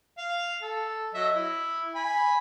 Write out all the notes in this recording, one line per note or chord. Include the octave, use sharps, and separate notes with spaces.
F5
A4
F#3 D#5 E5
E4
G#5 B5